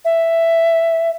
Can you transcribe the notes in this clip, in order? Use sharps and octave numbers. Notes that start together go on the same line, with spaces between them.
E5